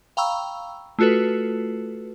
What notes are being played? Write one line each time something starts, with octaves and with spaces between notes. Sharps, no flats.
F5 G5 A#5 B5 C#6 E6
A3 F4 F#4 A4 B4